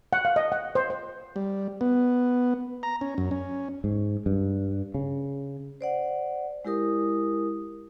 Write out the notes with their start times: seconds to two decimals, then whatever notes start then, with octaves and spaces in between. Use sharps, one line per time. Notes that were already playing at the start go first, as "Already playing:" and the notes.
0.13 F#5
0.25 F5
0.36 D#5
0.52 F#5
0.75 C5
0.90 C5
1.36 G3
1.81 B3
2.83 A#5
3.01 C#4
3.18 F#2
3.31 C#4
3.84 G#2
4.26 G2
4.94 C#3
5.81 C5 D5 F#5
6.65 G#3 E4 G4 A#4 D#6